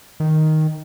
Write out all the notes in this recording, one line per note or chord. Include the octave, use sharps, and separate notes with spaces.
D#3